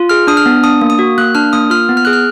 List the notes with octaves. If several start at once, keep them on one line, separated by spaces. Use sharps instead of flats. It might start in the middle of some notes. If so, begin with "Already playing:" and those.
Already playing: F4
G#4 F6
D4 D#6
F6
B3
D4 D#6
A#3
D#6
F#4
A#3 F#6
D4 F6
A#3 D#6
F4 F6
B3
F6
G#4 F#6
F6